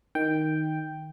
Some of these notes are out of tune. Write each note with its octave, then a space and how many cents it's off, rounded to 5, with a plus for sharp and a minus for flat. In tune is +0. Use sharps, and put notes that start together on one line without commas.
D#3 +0 G5 +0